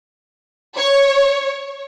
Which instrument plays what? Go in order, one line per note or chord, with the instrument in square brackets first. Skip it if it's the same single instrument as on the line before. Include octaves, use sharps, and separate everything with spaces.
[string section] C#5